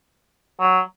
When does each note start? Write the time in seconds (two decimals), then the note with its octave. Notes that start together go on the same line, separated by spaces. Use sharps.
0.60 F#3